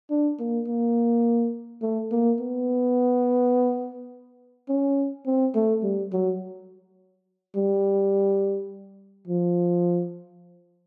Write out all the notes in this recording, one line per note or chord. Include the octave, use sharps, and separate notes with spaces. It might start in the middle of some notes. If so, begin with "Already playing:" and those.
D4
A#3
A#3
A3
A#3
B3
C#4
C4
A3
G3
F#3
G3
F3